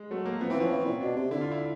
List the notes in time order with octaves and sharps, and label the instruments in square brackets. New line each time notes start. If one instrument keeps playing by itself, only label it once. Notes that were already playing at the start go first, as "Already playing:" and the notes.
Already playing: [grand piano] G#3
[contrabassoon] F#3 [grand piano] A3
[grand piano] A#3
[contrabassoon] F3 [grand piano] B3
[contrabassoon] E3 [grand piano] C4
[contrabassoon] F3 [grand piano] C#4
[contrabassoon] E3
A#2
[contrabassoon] B2 [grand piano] D4
[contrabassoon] C3
[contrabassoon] D3 [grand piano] E4
[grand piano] F4
E4